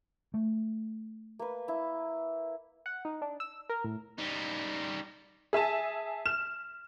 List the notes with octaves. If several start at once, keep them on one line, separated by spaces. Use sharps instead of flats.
A3
A#3 B4
E4
F#5
D#4
D4
E6
A#4
A2
G3 D#4
G#4 E5 G#5 A5
F6 E7